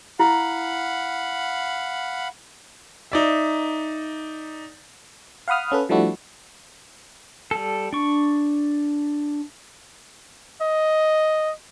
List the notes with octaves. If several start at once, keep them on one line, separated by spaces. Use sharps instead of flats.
E4 F5 F#5 B5
D#4 D5 E5
F5 F#5 B5 D#6 F6
C#4 A4 B4
F3 G3 A3 D4 E4 F#4
G3 A4
D4 C#6
D#5